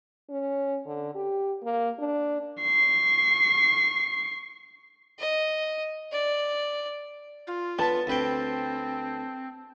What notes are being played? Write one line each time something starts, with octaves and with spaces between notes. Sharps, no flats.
C#4
D3
G4
A#3
D4
C#6 C7
D#5
D5
F4
B3 B4 A5
D2 C4 B4 G5